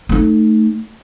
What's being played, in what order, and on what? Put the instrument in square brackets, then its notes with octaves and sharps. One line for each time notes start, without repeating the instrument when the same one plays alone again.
[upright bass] A3 D#4